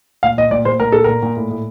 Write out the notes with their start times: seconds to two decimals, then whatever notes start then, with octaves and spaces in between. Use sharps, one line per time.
0.23 A#2 F5
0.38 A#2 D#5
0.51 A#2 D5
0.65 A#2 C5
0.80 A#2 A#4
0.92 A#2 A4
1.04 A#2 A#4
1.23 A#2
1.36 A2
1.50 A2